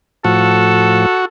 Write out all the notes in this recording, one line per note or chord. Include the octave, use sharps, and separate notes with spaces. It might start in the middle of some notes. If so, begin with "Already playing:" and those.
A2 F3 F#4 A4